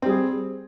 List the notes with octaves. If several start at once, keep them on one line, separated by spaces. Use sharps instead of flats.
G3 C4 G#4